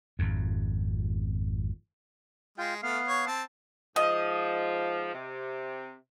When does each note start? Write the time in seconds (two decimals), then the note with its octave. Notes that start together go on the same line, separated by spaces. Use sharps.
0.19 G#1 F2
2.58 G#3 F4 G5
2.83 A3 B3 F5 F6
3.08 C#5
3.27 C4 A5
3.96 G#2 F3 D#5
5.13 C3